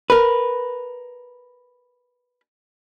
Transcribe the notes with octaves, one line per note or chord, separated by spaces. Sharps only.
A#4 B4